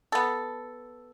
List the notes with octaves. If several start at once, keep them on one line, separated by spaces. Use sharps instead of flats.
B3 A4